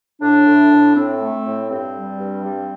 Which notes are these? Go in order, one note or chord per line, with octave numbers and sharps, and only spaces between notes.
A2 D4
A2
A2
A2 C4
A3
A2
G2 C4
G3
G2
G3